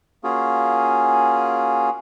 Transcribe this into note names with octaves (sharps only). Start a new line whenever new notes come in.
A#3 C#4 F4 F#4 G#4